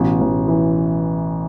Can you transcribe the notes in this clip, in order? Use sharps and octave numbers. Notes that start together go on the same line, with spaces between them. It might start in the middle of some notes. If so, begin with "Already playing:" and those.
Already playing: A1 B2
A1
E3